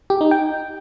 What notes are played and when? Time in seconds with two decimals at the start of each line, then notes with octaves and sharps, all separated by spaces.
0.10 G4
0.21 D#4
0.31 G5